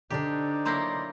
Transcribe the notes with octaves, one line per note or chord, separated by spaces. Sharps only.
D3 D4 D#4 G4 C5 D5
F#3 A#3 E4 C6 G6 A#6